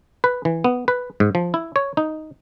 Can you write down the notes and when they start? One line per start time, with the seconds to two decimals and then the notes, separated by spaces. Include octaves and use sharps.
0.24 B4
0.45 E3
0.64 B3
0.88 B4
1.20 G#2
1.35 F3
1.54 E4
1.76 C#5
1.97 D#4